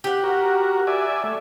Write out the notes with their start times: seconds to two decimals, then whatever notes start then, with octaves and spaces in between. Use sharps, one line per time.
0.04 G4 F#5
0.24 F#4 A#4
0.87 D5 E5 G#5
1.24 A3